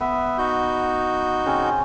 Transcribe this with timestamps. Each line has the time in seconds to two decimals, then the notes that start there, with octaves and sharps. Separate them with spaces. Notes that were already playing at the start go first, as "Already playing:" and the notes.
0.01 B3 E5
0.38 D#4 F#4 G6
1.46 C#3 C4 C#4